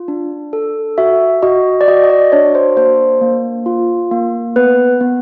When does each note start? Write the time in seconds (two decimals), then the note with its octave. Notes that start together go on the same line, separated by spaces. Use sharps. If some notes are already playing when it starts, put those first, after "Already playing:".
Already playing: F4
0.08 D4
0.53 A4
0.98 F#4 E5
1.42 F#4 D#5
1.81 D5
1.88 F#4 D#5
2.04 D#5
2.10 D5
2.32 D4 C#5
2.55 C5
2.77 A#3 C5
3.22 A#3
3.66 F4
4.11 A#3
4.56 B3 B4
5.01 B3